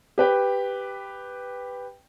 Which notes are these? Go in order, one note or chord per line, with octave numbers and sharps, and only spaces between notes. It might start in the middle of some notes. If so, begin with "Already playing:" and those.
G4 B4 G5